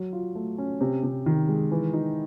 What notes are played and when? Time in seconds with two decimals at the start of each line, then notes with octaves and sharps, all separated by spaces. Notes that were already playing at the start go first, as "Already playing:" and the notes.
Already playing: F#3
0.13 F4
0.35 A3
0.58 C#4
0.81 C3
1.03 C3
1.26 D#3
1.49 G#3
1.72 E3
1.93 D#4